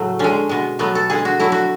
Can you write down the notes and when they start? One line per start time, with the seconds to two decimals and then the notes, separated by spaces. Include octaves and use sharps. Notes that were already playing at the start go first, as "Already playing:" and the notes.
Already playing: A2 C#3 F#3 A3
0.19 D3 G#3 C#4
0.49 B2 G#3
0.79 B2 F#3 A3 B3
0.95 A4
1.10 D3 G#3 G#4
1.25 F#4
1.39 D3 F#3 A3 E4
1.52 F#4